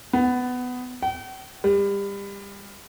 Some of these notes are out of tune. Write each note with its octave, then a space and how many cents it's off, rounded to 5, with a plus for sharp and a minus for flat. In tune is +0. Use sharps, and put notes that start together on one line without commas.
B3 +15
G5 -45
G3 +30